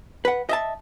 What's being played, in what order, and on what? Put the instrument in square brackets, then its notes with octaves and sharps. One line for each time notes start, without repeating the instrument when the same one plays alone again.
[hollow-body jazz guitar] B4 F#5
D#5 E5 A5